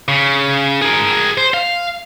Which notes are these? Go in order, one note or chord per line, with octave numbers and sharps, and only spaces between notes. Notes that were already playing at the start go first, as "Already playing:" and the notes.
C#3
G#4 A#4
C5
F5